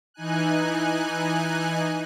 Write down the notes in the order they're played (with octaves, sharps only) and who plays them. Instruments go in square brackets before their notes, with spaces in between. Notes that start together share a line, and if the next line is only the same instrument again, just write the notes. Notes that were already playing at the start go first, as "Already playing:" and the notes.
[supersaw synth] E3 D#4 G#5 F#6